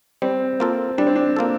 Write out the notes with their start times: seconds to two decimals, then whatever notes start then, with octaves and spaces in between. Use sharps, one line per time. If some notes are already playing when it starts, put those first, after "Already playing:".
0.22 G3 C4
0.60 A#3 F4 A4
0.98 G3 D4
1.07 C4
1.16 D4
1.36 A#3 F4 A4